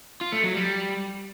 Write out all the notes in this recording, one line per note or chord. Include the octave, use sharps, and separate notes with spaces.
F4
A3
F#3
G3